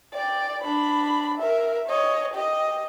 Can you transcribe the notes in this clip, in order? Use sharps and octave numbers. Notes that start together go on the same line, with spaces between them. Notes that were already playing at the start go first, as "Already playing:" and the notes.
D5 G5
D4 B5
A#4 E5
C#5 D#5
G4 D#5